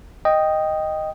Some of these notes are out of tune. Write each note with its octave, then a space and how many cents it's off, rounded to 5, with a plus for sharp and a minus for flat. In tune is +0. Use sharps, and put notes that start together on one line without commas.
D#5 +0 G5 +0